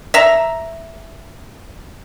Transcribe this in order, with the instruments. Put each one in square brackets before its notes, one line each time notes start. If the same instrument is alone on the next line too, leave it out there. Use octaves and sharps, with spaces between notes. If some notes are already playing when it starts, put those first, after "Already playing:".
[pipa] E5 A#5